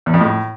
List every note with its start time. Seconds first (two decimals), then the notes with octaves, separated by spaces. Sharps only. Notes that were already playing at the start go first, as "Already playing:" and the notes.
0.06 E2
0.14 F2
0.21 A2